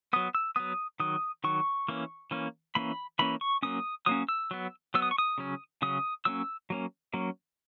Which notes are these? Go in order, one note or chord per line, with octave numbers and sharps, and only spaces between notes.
F#3 B3 D#6
E6
F#3 B3 D#6
D#3 F#3 D#6
D#3 F#3 C#6
E3 A#3 C#4
E3 A#3 C#4
E3 A#3 C#4 B5
E3 A#3 C#4 B5
C#6
F#3 A#3 C#4 D#6
F#3 A#3 C#4 D#6
E6
F#3 B3
F#3 B3 E6
D#6
C#6
D#6
C#3 F#3 C#4
C#3 F#3 C#4 D#6
F#3 A#3 C#4 E6
F#3 A#3 C#4
F#3 A#3 C#4